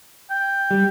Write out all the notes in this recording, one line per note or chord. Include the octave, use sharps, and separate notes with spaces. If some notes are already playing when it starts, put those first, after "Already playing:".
G5
G3